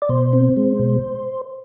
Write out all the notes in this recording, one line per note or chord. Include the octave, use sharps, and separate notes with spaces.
D5
B2 C5
C4
G#3
B2